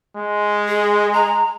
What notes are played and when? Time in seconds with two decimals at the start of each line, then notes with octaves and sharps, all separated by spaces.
0.16 G#3
0.68 G#4
1.13 A#5